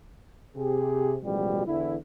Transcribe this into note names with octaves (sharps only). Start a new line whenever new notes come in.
C3 G4 G#4
A1 B2 F3 G3 G#3 F#4
E2 D3 E3 E4